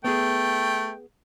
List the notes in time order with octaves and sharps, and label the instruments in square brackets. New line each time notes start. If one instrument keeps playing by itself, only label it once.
[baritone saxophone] A3 [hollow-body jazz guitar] B3 G#4 [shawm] G5